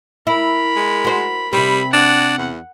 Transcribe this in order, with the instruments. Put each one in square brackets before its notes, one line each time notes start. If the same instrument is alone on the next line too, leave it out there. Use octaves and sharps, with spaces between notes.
[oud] E4 [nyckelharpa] A#4 B5
[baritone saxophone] G#3
[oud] F#4 C5
[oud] C3 C4 [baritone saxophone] G3 [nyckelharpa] B5
[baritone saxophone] D4 [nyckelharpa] F#5
[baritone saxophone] E2